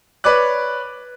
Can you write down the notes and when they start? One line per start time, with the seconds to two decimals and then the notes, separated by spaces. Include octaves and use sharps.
0.24 B4 C#5 D5 D6 F#6